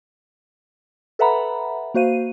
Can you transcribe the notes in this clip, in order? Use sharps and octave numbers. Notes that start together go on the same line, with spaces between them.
A4 B4 E5 F#5 A#5 B5
A#3 F#4 C5 F5 D#7